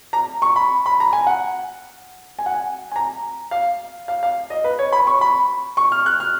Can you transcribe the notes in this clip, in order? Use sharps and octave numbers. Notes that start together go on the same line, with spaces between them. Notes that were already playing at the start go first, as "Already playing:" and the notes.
A#5
C#6
B5
B5
A#5
G#5
F#5
G#5
F#5
G#5
G#5
A#5
F5
F5
F5
D#5
B4
C#5
B5
C#6
B5
C#6
F6
F#6
F6